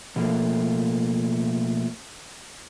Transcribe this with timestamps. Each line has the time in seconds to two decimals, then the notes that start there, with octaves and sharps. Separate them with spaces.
0.16 B2 F3 A3 A#3